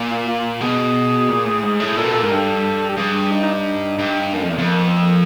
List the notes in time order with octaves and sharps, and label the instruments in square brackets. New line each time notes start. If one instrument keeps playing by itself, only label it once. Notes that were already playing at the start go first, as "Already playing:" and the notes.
Already playing: [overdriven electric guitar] A#2
[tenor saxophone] F4
F4
[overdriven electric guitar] B2 [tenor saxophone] G#4
[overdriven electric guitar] A#2
A2
G#2
A2
[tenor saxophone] G#4
[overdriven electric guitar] A#2 [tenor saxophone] A4
[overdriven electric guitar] B2
[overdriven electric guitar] A#2 [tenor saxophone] A4
[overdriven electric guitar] G#2 [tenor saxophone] A#4
[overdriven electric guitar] G2 [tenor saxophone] A4
[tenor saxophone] G4
[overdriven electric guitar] G2 [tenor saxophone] G#4
[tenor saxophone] D#4
D#4
D#4
[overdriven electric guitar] G2
[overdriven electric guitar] F#2 [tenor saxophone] A#3
[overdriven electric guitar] F2 [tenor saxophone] A3
[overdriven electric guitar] E2 [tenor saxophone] A#3
[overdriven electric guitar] F2 [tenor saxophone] A3
[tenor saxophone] A#3
B3
A3
A#3